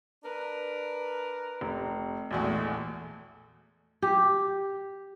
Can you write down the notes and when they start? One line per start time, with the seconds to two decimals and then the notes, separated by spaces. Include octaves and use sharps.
0.24 D4 A#4 B4
1.61 F1
2.31 A#1 E2 B2 G#3 A3 F#4
4.02 G4